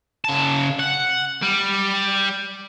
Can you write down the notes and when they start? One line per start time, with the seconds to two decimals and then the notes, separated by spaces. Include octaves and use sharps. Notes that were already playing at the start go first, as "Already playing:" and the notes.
0.25 C#3 A5
0.80 F#5
1.42 G3